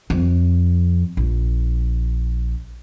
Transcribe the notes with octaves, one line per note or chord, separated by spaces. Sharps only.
F2
A#1